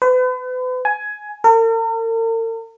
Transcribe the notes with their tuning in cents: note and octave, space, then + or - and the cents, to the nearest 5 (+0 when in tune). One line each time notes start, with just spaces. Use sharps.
B4 +40
G#5 +15
A#4 -45